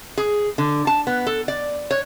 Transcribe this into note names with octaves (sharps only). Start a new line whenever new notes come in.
G#4
D3
A5
B3
A4
D5
C#5